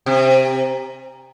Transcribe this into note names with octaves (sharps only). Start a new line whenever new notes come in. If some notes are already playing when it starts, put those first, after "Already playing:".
C3